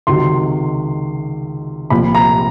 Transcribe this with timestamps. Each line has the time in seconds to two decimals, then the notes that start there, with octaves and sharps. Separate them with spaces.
0.07 C#2 C3 D#3 F#3 C6
1.90 C2 A#2 F3 B5
2.15 A#5